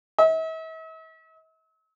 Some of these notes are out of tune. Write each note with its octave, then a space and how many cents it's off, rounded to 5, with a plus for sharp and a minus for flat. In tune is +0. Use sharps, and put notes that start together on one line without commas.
E5 -45